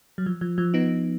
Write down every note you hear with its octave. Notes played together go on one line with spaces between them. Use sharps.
F#3
F3
F3
F3
B3 D#4